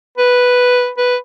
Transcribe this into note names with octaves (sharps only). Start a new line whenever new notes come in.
B4
B4